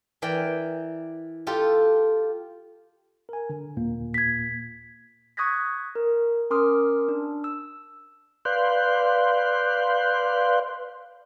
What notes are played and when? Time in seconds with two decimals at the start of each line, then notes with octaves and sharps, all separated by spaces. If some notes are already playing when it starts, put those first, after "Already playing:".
0.22 E3 A#4 D5 G5
1.47 F4 G4 A4
3.29 A#4 G#5
3.50 D3
3.77 D#2 A#2 A#3
4.14 G#6 B6
5.37 C#6 D#6 F#6 G#6 A#6 B6
5.95 A#4
6.50 C#4 A#4 C6 D6 D#6 F6
7.08 D4
7.44 E6
8.45 B4 D5 F5 C6 F#6 G6